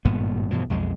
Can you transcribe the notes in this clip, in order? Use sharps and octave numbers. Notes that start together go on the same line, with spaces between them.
G#1 G2 A#2 B3
G2 B2 E3 F3
B1 F2 G#3